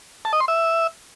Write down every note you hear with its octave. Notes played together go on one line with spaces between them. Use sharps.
A5
D#5
C6
E5